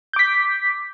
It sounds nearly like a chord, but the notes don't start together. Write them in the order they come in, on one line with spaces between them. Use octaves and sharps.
G6 D6 B6